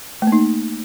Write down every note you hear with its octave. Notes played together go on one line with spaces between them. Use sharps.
A3
A#3
D#4